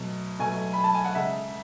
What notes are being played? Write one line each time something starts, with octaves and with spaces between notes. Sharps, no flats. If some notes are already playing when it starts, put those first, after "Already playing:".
Already playing: B2 F#3 A3
B2 F#3 A3 G#5
B5
A5
G#5
F#5
C#3 G#3 E5